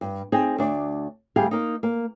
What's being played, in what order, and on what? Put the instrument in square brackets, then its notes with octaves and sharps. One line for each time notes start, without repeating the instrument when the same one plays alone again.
[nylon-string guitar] G2
C4 D#4 G#4
D2 D4 D5
D2 G3 G4 G#4 F5
A#3 D#4
A#3